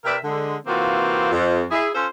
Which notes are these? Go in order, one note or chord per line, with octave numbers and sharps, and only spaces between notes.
C3 A#4 B4 D5 E5
D3 G#3
C3 E3 A#3 C4 F4 F#4
F2
E4 G#4
C#4 F4 A4 C5